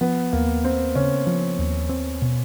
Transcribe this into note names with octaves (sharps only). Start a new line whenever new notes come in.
F3 B3
D#2 A#3
A#3 C4
C#3 C#4
F3
D#2
C4
B2